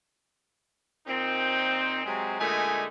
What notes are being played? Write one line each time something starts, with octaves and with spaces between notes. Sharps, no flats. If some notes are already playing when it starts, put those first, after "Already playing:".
A#2 C4 D#4
C3 F#3 G#3 C4
A#2 D3 G#3 A3 D#4 G#5